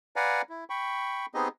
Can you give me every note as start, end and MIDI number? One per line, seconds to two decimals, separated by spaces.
0.16 0.42 71
0.16 0.42 74
0.16 0.42 77
0.16 0.42 78
0.16 0.42 80
0.16 0.42 82
0.49 0.64 64
0.70 1.26 79
0.70 1.26 83
0.70 1.26 85
1.34 1.48 59
1.34 1.48 60
1.34 1.48 63
1.34 1.48 67
1.34 1.48 68
1.34 1.48 75